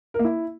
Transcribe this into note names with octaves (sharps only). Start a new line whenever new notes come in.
A#4
A#3
E4